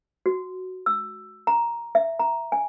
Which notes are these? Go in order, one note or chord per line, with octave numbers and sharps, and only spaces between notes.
F#4
E6
A#5
E5
A#5
G#5